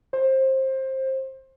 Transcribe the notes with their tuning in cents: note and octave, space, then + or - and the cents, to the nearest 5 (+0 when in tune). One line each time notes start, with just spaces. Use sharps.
C5 +20